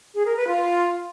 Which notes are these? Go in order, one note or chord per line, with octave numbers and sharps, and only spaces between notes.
G#4
A#4
B4
F4